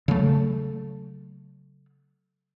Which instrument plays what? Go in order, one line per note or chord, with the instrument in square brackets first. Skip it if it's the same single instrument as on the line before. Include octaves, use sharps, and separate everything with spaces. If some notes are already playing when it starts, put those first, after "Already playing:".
[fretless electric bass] C#3 F#3 A3